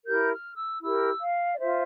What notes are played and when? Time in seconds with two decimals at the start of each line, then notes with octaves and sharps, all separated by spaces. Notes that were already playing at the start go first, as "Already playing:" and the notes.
0.05 E4 G4 A#4 G6
0.30 F6
0.56 E6
0.81 E4 G4 A#4 E6
1.20 F5
1.53 D5
1.59 F4 C5 E5